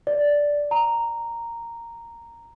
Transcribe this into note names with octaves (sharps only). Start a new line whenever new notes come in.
D5
A#5